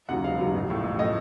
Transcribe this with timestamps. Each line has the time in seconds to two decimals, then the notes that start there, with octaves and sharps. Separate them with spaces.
0.09 D#2 C#3 F#3 F#5
0.24 E1 F5
0.39 D#2 C#3 F#3
0.54 A1
0.69 A2 F3
0.84 A1
0.99 A2 F3 D#5